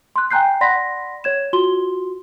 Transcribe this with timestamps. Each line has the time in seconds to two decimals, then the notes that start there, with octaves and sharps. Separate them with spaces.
0.16 C6 F#6
0.31 G5 G#5 A#5 F#6 G6 C7
0.61 D5 F#5 B5 C6 A#6 B6
1.24 C#5 G#6 E7
1.53 F4 F#4 C6 G7